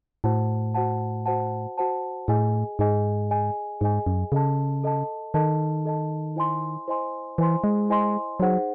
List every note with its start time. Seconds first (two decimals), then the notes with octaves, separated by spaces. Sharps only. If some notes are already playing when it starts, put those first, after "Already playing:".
0.24 A2 F#4 C5 F#5 A5
0.74 F#4 C5 F#5 A5
1.26 F#4 C5 F#5 A5
1.78 F#4 C5 F#5 A5
2.28 A2 G#4 D#5 G#5
2.79 G#2 G#4 D#5 G#5
3.31 G#4 D#5 G#5
3.80 G#2 G#4 D#5 G#5
4.07 F#2
4.32 C#3 A4 D#5 A5
4.84 A4 D#5 A5
5.34 D#3 A4 D#5 A5
5.85 A4 D#5 A5
6.36 E4 C5 D#5 G#5 C6
6.88 E4 C5 D#5 G#5 C6
7.38 E3 E4 C5 D#5 G#5 C6
7.64 G#3
7.89 E4 C5 D#5 G#5 C6
8.40 F#3 D#4 G#4 C5 F#5